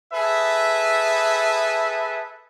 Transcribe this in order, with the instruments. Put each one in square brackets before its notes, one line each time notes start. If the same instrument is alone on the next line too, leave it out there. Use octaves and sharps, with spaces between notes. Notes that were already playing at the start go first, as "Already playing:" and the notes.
[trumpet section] G#4 A4 B4 E5